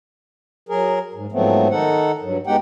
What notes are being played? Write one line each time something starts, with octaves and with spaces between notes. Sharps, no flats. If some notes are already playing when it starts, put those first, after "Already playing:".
F#3 G#4 A#4
G#2
G#2 F3 F#3 A3 B3 C4
D#3 D#4 A4 F#5
G2 F#3
G#3 B3 D#4 G4 F#5 G5